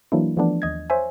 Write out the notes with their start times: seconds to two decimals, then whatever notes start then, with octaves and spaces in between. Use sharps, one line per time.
0.12 E3 F#3 A#3 D4 E4
0.37 E3 F3 A3 B3 D4
0.62 D#2 D#5 G#6
0.90 C5 C#5 E5 G#5